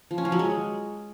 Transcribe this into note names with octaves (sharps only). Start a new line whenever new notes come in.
F3
C#4
F3
F#3
G#3